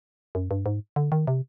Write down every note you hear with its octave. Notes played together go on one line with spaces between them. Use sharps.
F#2
G2
G#2
D3
D#3
C3